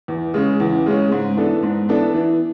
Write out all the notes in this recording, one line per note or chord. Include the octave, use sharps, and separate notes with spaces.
E2
C#3 G#3 C#4
E2
C#3 G#3 C#4
G#2
E3 B3 D4 A4
G#2
E3 B3 D4 A4
E3